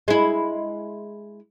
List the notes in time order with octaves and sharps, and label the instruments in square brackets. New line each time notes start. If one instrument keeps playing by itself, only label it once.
[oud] G#3 E4